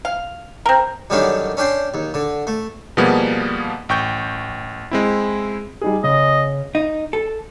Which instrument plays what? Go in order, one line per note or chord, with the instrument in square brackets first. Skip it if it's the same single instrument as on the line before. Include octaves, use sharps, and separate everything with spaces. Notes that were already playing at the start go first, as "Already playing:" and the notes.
[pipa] F5
C4 A#4
[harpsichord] F#2 D3 D#3 G3 C#4 D4
C#4 D4 G5 C6
D#2
D3
A3
[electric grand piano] B2 F3 G3 A#3 B3 G#4
A1 G5 C#6 G6
G#3 C4 E4
[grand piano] G3 D#4 G#4
[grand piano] C#3 [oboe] D#5
[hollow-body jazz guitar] D#4
A4